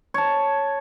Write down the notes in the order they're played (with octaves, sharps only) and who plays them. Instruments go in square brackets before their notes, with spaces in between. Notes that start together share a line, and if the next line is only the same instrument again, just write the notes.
[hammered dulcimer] C#5 A5